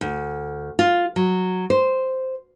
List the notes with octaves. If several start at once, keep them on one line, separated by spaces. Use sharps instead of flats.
D2
F4
F#3
C5